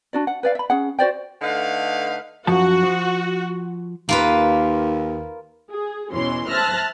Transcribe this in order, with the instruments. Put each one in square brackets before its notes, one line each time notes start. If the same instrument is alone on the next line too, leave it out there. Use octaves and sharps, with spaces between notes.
[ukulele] D4 F#4 D5
F#5
B4 D5 F5
E5 B5
C#4 G#4 F#5
F#4 C5 D5 G5
[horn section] D3 A3 D#4 B4 F5
[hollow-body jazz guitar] F#2 F3 A5 [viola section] F#4
[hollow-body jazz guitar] F3
[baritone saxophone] D#2 [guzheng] A#3 F4 B4
[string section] G#4
E2 B2 E3 C#4 C6
C5 E5 A5 F6 F#6 A#6